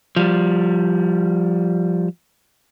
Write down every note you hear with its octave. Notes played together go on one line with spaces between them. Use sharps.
F3 G3